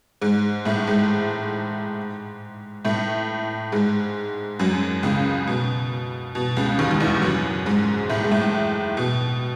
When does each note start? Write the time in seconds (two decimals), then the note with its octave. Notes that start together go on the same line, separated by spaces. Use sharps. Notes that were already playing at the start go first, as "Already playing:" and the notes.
0.21 G#2 G#3
0.65 A2 A3
0.87 G#2 G#3
2.85 A2 A3
3.72 G#2 G#3
4.59 F#2 F#3
5.03 C#2 C#3
5.47 B2
6.35 B2
6.57 C#2 C#3
6.79 D#2 D#3
6.91 D#3
7.00 E2 E3
7.22 F#2 F#3
7.66 G#2 G#3
8.10 A2 A3
8.24 G#3
8.31 A2 A3
8.97 B2